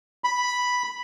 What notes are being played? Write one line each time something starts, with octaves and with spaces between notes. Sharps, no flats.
B5